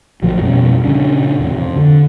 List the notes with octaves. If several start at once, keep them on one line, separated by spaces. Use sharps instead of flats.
A#1 A2 F3 F#3
F2 B2 G3 C#4
A#2 C#3 C#4 D4
E2 C3
F2
D3